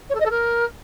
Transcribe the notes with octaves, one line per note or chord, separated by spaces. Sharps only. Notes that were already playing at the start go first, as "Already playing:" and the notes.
C#5
A4
D#5
A4
A#4